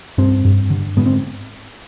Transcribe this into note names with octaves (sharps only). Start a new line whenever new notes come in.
G2 C4
G2
D3
G#2 B3
C4